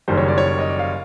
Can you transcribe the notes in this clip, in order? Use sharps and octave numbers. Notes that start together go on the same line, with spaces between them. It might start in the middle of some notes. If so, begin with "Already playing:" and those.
F#1 F#2 D#3 G3 C5
C#5
D5
C#5
D#5
D5
F5